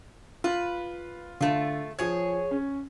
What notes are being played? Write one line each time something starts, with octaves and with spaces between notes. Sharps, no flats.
F4 B4
D3 A3 F4
F3 G#4 C#5 G#6
C#4